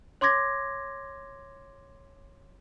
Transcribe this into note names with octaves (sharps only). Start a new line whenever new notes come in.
C#5 C6 D6 G#6 A#6